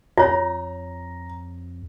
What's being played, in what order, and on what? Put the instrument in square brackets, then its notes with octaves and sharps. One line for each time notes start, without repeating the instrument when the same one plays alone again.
[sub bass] F2 [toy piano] F4 C#5 [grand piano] A#5